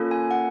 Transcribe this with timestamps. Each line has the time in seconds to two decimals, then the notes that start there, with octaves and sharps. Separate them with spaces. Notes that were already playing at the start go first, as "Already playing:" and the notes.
Already playing: A#3 C#4 F4 A4
0.11 G#5
0.31 F#5